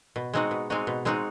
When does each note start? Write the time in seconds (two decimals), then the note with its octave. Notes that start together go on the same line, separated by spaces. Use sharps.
0.16 B2
0.33 G#3 C4 D#4 F#4
0.51 B2
0.70 G#3 C4 D#4 F#4
0.87 B2
1.05 G#3 C4 D#4 F#4